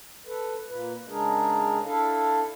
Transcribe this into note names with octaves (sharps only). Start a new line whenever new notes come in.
A4 B4
A#2 A#3 B4
C#3 G#3 D4 G#4 A#4
D4 E4 A4 F5